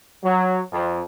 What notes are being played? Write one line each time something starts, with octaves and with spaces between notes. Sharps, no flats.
F#3
F2